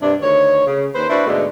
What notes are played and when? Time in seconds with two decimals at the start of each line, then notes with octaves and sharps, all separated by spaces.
0.02 G2 C3 D4
0.22 D2 D#3 C#5
0.66 C#3
0.95 D#2 B4 C5
1.10 D4 E4 F#4 B4 C5
1.27 G#2 B2 D3 G#3 A3